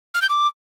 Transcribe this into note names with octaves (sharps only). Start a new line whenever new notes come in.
F6
G6
D6